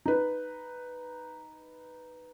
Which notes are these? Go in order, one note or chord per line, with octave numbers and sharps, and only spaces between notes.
D#4 B4